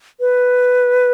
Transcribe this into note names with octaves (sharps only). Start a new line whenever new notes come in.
B4